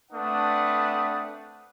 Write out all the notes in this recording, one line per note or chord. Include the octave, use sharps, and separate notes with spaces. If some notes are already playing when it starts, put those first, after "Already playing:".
A3 C4 D4 B4 F#5 D#6